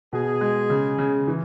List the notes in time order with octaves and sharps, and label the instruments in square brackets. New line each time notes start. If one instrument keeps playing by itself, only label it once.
[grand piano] B2 [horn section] G#4
[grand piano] G#3
C#3
C#3
E3